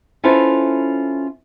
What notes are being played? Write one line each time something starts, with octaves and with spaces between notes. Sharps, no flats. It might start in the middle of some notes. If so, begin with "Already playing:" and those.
C#4 E4 F4 A4 B4 C5